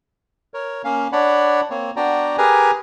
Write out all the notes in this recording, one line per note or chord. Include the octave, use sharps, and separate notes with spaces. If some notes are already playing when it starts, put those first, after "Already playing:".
A#4 C#5
A#3 C#4 F5
D4 C#5 D5 F#5 B5
A#3 C4 C#5
B3 D4 F#4 D5 G5 A#5
G4 G#4 A#4 B4 G#5 A#5